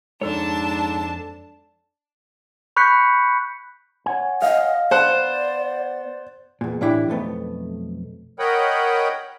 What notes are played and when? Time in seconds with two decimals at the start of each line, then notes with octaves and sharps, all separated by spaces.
0.22 F2 G#2 D4 A4 C#5 A5
2.76 B5 C#6 F#6 G6 B6 C#7
4.06 C#5 F#5 G#5
4.42 D#5 F5
4.91 B3 C5 D5 F#5 F#6
6.61 E2 A#2
6.81 A2 E3 D4 E4 G4
7.08 B1 F2 A3 B3
8.39 A#4 C#5 D#5 F#5 G5 B5